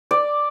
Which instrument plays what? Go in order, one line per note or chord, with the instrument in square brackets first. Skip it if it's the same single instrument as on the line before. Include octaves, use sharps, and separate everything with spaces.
[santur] D5